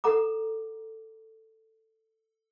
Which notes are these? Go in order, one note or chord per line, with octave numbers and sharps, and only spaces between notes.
A4 F#5 A#5 D6